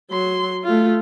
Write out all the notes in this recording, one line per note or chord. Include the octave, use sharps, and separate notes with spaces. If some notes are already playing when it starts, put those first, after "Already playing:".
F#3 C6
A3 F4